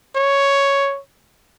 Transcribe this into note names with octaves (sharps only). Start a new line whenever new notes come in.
C#5